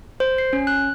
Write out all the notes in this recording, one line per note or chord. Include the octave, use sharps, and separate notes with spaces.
C5
C7
C#4
F#6